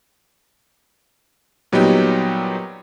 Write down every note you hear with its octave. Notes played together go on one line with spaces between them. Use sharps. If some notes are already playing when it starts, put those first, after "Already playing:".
A#2 F#3 G3 B3 D#4 G4